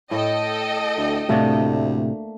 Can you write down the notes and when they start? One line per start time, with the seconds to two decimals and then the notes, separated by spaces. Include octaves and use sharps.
0.11 A2 A4 D#5 G5
0.97 D2
1.29 D2 A2 C3 A3 A#3 D4